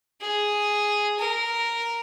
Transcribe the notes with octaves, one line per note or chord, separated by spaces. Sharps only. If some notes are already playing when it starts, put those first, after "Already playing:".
G#4
A#4